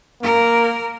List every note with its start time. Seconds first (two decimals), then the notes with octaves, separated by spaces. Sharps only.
0.23 A#3 A#4